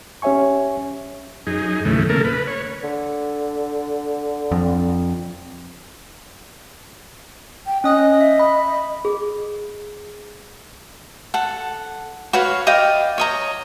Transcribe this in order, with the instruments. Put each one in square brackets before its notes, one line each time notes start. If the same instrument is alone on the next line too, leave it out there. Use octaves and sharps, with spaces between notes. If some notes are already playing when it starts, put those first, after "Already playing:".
[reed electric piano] C#4 G4 C#5 E5 G#5 C#6
[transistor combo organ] F#2 D#4 G#4
D#2 A2 C#3 E3 A3
C#3 A#3 A4 A#4
B4
C#5
[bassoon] D3
[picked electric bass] F2
[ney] G5
[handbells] C#4 D#6 F#6 [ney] D#5
[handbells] E5
B5
[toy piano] G#4
[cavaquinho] A4 F#5
F#4 B4 C#5 F5
D5 D#5 F5 G5
C#5 D#5 A#5